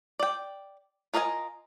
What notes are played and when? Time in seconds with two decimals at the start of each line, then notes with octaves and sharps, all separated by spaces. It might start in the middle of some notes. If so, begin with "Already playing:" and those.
0.19 D5 G5
1.14 F4 A#4 D#5 F5 G#5